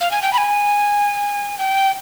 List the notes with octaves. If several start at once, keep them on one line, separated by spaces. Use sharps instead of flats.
F5
G#5
G5
B5
G#5
G5